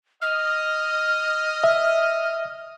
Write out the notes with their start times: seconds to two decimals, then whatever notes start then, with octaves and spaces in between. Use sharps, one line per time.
0.22 D#5 F6
1.64 E5